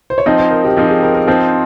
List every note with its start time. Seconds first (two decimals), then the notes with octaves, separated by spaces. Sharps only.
0.10 C5
0.18 C#5
0.26 F3 C4 D#4 D#5
0.38 C5
0.51 A#4
0.64 G4
0.76 F3 C4 D#4 G4
0.89 G#4
1.02 A#4
1.15 A#4
1.27 F3 C4 D#4 C5